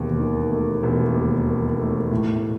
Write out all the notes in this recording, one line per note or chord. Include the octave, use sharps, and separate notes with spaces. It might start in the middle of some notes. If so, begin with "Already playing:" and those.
Already playing: E1 D#2
D#3
A3
E1
D#2
D#3
A3
A2